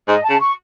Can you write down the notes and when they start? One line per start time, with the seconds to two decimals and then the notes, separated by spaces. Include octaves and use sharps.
0.08 G#2 D#5
0.24 A5
0.30 C#3
0.40 C#6